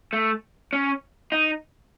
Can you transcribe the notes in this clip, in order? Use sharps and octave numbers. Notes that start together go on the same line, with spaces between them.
A3
C#4
D#4